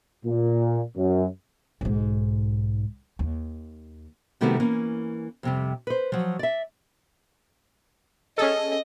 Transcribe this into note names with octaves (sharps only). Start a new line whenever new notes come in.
A#2
F#2
B1 G#2
D#2
C3 D#3 G3 A3 B3 F#4
E3 A#3 C#4
F2 C3 G3
B4 C5
F3 F#3
D5 E5
C#4 G#4 A4 D#5